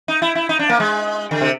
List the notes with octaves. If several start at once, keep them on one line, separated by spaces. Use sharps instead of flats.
D#4
E4
E4
D#4
D4
A#3
G#3
D3
C3